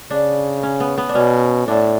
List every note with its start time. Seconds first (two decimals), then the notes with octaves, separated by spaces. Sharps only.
0.10 C#3 D4
0.63 C#4
0.80 B3
0.98 B3
1.09 D4
1.15 B2 C#4
1.67 A2 D4